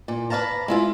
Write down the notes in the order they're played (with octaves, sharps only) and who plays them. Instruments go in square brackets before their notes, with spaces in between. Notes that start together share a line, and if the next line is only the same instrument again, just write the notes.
[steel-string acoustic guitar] A#2
B4 C5 F5 A5 A#5
G#3 E4 F4